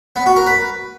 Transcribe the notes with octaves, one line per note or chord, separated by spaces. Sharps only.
B3
F#4
A#4
B4